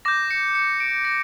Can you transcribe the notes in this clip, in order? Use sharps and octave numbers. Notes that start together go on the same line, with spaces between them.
D6 G6 A#6
C#7
C#7
D7
A#6